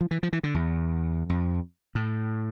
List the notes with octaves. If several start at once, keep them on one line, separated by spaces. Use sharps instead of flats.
F3
E3
F3
E3
D3
E2
F2
A2